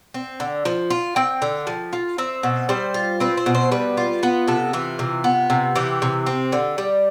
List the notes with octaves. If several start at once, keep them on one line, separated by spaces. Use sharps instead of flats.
C4
D3
F3
F4
C4 G5
D3
F3
F4
C4 E5
B2
G3 C5
F4
C4 B4
C5
B2
C5
G3 B4
F4
B3 B4
C3 A4
E3 F4
C3
B3
C3
E3 G4
C3
C4
D3
G3